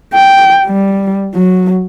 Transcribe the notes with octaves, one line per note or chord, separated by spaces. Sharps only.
G5
G3
F#3